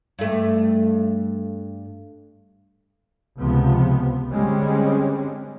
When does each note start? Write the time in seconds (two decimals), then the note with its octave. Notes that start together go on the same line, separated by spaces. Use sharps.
0.19 G2 A3
3.38 C#2 C3 F3 B3
4.30 D3 G3 G#3 C4 C#4